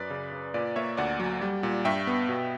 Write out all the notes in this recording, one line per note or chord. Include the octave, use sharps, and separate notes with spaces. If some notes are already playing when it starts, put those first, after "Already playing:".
Already playing: F#2 B4 D5
C#3
C#3
A#2 B4 D5
A#3 C#5 E5
D2 D5 F#5
F#3
G3
A#2
G2 E5 G5
B3
B2